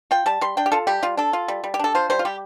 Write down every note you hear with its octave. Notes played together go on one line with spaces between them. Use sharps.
F4 G5
G3 A5
G3 C6
D4 G5
G4
F4 A4
G3 G4
G3 F4
D4 A4
F4
G3
G3
G4
D4 A4
F4 C5
G3 C5
F4
G3 G4